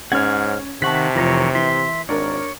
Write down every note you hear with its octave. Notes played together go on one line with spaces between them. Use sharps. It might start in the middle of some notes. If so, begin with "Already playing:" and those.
G#2 C#4 F#5 F6 G#6
C3 D#3 F#5 A5 C#6 B6
F1 E3 F4 A#4 C#5
E3 E5 C6
G#1 D4 A#4 C#5